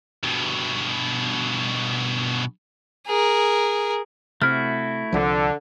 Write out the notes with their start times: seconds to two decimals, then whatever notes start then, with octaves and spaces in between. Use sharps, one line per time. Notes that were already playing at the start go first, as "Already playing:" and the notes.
0.24 G2 B2
3.06 G#4 A#4
4.42 C3 A3 E4 F#4 F6
5.13 C2 D3 F3